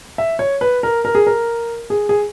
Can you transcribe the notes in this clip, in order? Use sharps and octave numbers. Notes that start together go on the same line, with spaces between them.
E5
C#5
B4
A#4
A#4
G#4
A#4
G#4
G#4